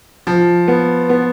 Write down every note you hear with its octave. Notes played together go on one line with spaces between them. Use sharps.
F3
B3
B3